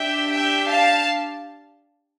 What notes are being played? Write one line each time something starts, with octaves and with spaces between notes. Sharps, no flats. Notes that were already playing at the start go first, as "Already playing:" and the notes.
Already playing: D4 G4 E5 G5
E5 G5
F5 A5